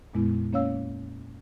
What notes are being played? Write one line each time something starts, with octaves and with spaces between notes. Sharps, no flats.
F2 A#2 G#3 B3 E4
A#3 C#4 C#5 F5 E6